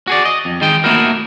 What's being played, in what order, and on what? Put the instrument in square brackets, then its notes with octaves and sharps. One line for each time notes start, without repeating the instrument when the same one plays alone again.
[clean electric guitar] F#4 G#4 D5
D#5
F2
D#3 G#3 D#4 G5
A3 A#3 D#4 E4 F#4 A#4